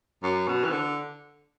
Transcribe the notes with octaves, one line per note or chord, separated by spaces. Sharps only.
F#2
B2
E3
D3